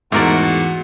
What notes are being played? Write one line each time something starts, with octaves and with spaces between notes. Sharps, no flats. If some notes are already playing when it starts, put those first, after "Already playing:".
E2 G#2 A3 F#4 A#4 D5